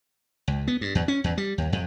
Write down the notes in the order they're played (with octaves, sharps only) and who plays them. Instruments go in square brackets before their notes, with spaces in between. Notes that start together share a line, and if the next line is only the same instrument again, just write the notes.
[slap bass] C#2
B3
G2
E2
C#4
E2
G3
D#2
F2